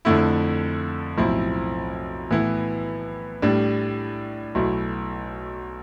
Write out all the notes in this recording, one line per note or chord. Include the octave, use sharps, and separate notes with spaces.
F2 D3 A3 E4
B1 A2 F3 C4 E4
A2 E3 B3 E4
A2 G3 D4
B1 B2 A3 E4